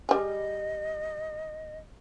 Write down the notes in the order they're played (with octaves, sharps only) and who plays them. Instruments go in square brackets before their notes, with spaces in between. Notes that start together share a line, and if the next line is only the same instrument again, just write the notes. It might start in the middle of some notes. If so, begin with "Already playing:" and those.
[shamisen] G3 G#4 [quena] D#5